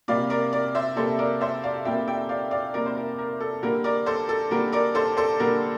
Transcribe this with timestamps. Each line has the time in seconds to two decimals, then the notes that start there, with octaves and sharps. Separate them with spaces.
0.08 C3 G3 A#3 D5 F5
0.30 A#4 D5
0.53 A#4 D5
0.75 C5 E5
0.96 C3 G3 A#3 A4 C5
1.19 A#4 D5
1.41 C5 E5
1.64 D5 F5
1.85 C3 G3 A#3 E5 G5
2.08 E5 G5
2.29 D5 F5
2.51 D5 F5
2.74 C3 G3 A#3 A#4 D5
2.86 C5
2.96 A#4
3.18 A#4
3.40 A4
3.62 D3 G3 A#3 A#4
3.84 A#4 D5
4.06 A4 C5
4.29 A4
4.51 D3 G3 A#3 A#4
4.72 A#4 D5
4.95 A4 C5
5.17 A4 C5
5.40 D3 G3 A#3 A#4